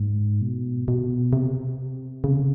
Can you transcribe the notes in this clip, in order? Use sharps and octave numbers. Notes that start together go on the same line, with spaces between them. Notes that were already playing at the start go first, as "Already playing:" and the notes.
Already playing: G#2
B2
B2
C3
C#3